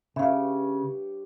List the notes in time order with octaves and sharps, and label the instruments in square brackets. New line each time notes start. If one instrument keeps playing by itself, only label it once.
[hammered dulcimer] G2 G4 C#5 [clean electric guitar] C#3 [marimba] E5 F5